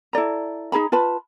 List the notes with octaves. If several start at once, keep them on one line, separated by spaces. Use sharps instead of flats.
E4 A4 D5 A#5
D#4 G#4 A#5 B5
F4 B4 A5 B5